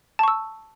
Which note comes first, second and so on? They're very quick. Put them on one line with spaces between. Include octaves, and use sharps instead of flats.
A5 C#6 E6